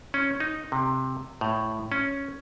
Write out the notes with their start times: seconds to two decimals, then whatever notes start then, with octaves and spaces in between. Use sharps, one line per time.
0.14 C#4
0.40 D#4
0.72 C3
1.41 A2
1.92 C#4